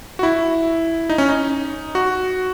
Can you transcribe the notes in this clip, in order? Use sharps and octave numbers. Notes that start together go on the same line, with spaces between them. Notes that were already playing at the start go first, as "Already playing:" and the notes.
F#4
E4
D#4
C#4
D#4
F#4